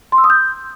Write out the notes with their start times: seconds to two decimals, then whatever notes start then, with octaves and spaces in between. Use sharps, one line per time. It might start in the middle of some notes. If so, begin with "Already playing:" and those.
0.12 C6
0.18 E6
0.24 D#6
0.30 G6